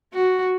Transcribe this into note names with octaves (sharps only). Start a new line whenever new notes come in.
F#4